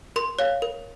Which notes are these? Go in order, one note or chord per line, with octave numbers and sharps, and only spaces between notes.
A#4 C6
C#5 F5
A#4